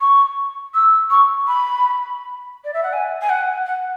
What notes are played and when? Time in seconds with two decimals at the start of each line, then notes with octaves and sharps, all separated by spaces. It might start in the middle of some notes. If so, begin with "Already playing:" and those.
0.01 C#6
0.74 E6
1.10 C#6
1.47 B5
2.64 D5
2.74 E5
2.83 F#5
2.93 G#5
3.21 G#5
3.29 F#5
3.66 F#5